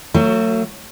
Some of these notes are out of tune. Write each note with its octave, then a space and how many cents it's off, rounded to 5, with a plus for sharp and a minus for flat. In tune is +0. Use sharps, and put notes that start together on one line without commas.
F#3 +0 A3 +40 F#4 +20